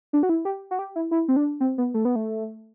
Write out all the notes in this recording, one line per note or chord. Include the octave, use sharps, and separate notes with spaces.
D4
F#4
E4
G4
F#4
G4
E4
E4
C4
D4
C4
B3
A3
B3
A3